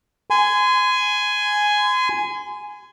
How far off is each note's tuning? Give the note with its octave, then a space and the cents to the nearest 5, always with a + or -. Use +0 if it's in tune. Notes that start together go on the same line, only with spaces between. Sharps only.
G#5 +5 C6 -35